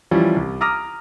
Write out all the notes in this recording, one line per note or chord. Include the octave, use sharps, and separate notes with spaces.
E3 F3 G3 C#4 E4
C2
A#5 D6 D#6 F6 A#6